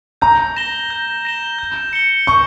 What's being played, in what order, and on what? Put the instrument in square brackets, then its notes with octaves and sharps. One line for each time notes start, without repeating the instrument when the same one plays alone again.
[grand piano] A#5 [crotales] G6
[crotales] A#6 E7 G7
G6
A#6 E7 G7
G6
C#7 G7
[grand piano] C#6 [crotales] G6